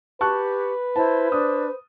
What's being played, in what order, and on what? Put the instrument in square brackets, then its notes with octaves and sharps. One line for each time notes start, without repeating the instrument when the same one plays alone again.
[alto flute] G4 [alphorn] B4 [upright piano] A5 C#6 F#6
[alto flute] E4 [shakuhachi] C5 [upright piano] A5
[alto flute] D4 [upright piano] D#6